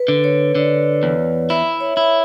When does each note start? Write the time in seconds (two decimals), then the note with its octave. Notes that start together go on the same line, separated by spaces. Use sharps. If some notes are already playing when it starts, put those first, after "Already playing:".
Already playing: B4
0.08 D3
0.24 C#5
0.55 D3 D5
1.03 E2
1.50 E4 E5
1.81 C#5
1.97 E4